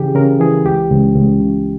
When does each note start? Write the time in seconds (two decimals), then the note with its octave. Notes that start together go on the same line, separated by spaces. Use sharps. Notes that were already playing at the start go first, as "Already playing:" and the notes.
Already playing: C#3 E3 G4 G#4
0.15 C#3 A#4
0.40 E3 G#4
0.65 C#2 G4
0.90 C#2
1.16 C#2
1.40 C#3